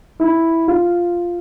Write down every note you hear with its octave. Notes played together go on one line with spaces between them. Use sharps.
E4
F4